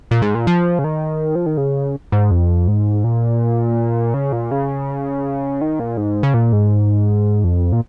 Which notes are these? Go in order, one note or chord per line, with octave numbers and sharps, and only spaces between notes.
A#2
G#2
A#2
F3
C#3
D#3
F3
D#3
C#3
G#2
F2
G#2
A#2
C#3
A#2
C#3
D#3
A#2
G#2
C#3
A#2
G#2
F2
A#2